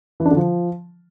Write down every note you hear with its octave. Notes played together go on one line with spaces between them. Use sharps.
E3
D4
D3
F3